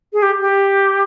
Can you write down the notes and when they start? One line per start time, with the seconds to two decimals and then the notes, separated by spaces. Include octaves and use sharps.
0.13 G#4
0.22 G4
0.40 G4